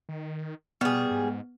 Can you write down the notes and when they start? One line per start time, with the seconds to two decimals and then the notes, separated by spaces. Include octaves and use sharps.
0.09 D#3
0.81 B2 G3 B3 G#4
1.11 G#2